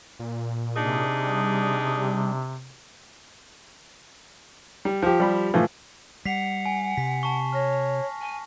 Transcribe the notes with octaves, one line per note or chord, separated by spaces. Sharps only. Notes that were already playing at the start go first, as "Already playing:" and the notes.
A#2
C3 D4 D#4 G#4
G3
G3
F3 G4
G3 B5
A2 E3 F3
G3 F#5 B6 C7 F7
G#5
C3 B6
A5 C#6
C#5 F6 A#6
G#5